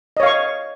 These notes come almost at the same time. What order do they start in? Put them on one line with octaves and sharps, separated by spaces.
D#5 C#5 F5 C#6